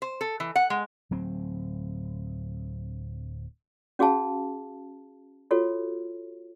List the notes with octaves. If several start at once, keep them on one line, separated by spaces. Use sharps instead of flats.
C5
A4
E3
F#5
G#3
D1 F#3 C4
C#4 F#4 G#4 F5 A5
F4 F#4 A4 C#5